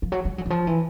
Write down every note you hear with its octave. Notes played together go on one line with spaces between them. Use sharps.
F3
F#3
G3
F#3
E3
F3
E3